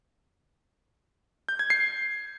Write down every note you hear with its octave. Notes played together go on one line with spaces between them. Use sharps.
G6
G#6
C7